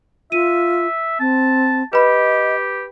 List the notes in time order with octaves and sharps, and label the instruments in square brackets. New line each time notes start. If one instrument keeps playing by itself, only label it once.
[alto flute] F4 [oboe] E5 [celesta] D#7
[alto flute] C4 [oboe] A5
[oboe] G4 [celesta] B4 B5 [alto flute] D#5